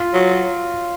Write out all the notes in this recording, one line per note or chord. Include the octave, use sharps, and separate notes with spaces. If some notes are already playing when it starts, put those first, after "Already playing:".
Already playing: F4
F#3